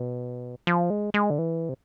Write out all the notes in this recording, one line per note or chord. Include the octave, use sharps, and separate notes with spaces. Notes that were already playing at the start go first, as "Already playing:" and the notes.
Already playing: B2
F3
G#3
G#3
D3
E3
C3